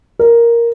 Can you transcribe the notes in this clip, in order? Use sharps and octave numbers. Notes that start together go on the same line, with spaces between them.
A#4